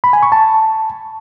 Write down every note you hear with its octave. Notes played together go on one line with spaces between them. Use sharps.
B5
G#5
C#6
A5